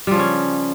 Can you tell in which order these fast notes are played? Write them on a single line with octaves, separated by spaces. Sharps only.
G3 F3 C#3 C#4